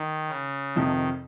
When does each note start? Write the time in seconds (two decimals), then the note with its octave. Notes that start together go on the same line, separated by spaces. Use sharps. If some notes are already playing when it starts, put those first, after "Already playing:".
Already playing: D#3
0.28 C#3
0.76 F2 C3 D#3 F3